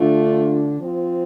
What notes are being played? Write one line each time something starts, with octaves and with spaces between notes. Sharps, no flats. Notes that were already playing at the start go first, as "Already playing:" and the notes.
Already playing: D3 A3 D4 F4
F3 C4 F4